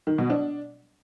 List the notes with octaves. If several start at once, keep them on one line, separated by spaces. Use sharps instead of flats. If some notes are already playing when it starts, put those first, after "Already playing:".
D#3
B2
D4